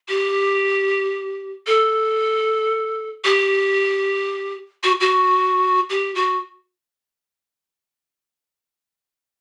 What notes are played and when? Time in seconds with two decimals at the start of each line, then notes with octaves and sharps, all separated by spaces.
0.08 G4
1.66 A4
3.24 G4
4.83 F#4
5.00 F#4
5.90 G4
6.15 F#4